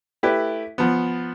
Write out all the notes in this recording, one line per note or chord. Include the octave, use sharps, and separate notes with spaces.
A3 E4 G4 B4
F3 B3